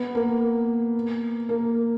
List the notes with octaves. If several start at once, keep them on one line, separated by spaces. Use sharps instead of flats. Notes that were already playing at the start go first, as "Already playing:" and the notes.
Already playing: B3
A#3
A#3